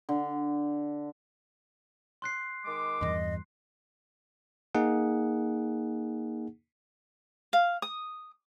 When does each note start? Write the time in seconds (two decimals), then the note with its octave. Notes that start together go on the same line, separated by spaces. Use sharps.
0.09 D3
2.22 C6 F#6 C7
2.65 D#3 G#3 D6
3.01 E2 G2 D#5
4.75 A#3 D#4 G#4 F#5
7.53 F5
7.82 D#6